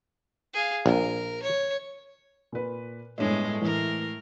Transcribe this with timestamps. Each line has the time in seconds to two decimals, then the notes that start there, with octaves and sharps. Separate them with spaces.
0.54 G#4 F5
0.86 A#1 A#4
1.43 C#5
2.52 A#2 B4
3.18 G1 A2 D3 G#3 C#5
3.62 A2 E3 A#4